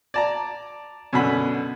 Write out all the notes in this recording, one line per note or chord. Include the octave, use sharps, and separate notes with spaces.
D5 A5 A#5
F#2 B2 D3 B5